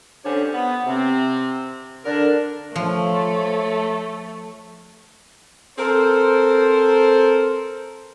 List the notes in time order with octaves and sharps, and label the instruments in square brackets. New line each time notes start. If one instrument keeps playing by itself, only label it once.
[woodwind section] D3 C#4 D4 G4 C5 C#5
B3
C3 C4
D3 D4 A#4
[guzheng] F3 [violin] A3 [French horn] C#5
[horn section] C4 A4 A#4 C5